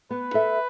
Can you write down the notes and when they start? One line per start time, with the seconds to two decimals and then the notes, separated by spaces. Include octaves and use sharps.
0.11 B3 B4
0.34 A4 E5